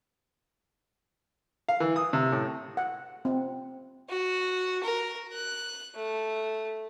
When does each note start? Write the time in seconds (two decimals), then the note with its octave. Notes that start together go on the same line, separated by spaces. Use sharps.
1.69 F5
1.80 E3
1.96 D#6
2.13 C3
2.32 A2
2.77 F#5
3.25 C4
4.09 F#4
4.84 A#4
5.33 F#6
5.95 A3